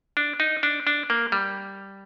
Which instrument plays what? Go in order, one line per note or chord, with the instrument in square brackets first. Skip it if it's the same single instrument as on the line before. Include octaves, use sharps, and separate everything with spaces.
[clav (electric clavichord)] D4
D#4
D4
D4
A#3
G3